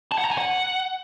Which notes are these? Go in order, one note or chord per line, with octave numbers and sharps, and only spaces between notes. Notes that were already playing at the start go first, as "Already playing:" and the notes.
A5
F#5
A#5
G#5
F#5